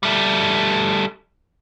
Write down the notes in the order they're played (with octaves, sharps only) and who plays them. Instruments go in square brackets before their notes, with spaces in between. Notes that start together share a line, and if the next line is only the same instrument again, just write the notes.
[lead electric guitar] G3 A3